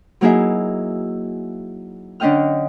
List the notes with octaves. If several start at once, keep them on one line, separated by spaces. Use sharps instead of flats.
F#3 A#3 D#4 E4 G#4 E5
D3 C#4 D4 D#5 G5 F6